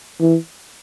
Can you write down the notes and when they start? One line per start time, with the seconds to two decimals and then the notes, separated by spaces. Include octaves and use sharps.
0.20 E3